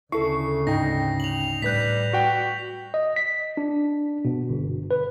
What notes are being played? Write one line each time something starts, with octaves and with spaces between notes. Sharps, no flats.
D2 C#3 E4 A4 C#6 C7
G#2 D#4 G5 A#6
F7 F#7
A2 G3 B4 F#6 G6 B6
F#4 G5
D#5
B6
D4
B2
G1
B4